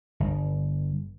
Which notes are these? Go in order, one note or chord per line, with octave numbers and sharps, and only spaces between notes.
G1